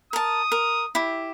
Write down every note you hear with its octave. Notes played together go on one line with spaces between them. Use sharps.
A#4 A5 D#6
A#4
E4 G4